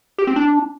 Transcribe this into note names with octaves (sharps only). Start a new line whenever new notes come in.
G4
C4
D4